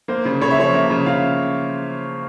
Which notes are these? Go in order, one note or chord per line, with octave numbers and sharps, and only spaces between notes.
A#3 C5
C#3
C#3 C#5
E5
F3 C#5
A#3 E5
C#3
C#3 F5